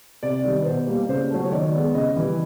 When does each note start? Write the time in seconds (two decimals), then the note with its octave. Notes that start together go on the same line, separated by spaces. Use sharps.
0.23 C3 D5
0.45 D#3 G3
0.61 B4
0.66 B2 C5
0.87 G3 A#3
1.09 C#3 C5
1.30 F#3 A3
1.45 C#5
1.51 D#3 D5
1.73 G#3 B3
1.94 C#3 D#5
2.16 E3 G3